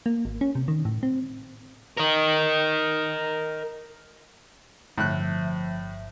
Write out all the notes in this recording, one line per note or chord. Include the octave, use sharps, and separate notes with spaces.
A#3
G#1
C#4
C3
D#3
A2
C4
A#4 D#5
G1 A2 F3 E5 F#6